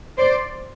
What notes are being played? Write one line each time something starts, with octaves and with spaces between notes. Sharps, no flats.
C5 D5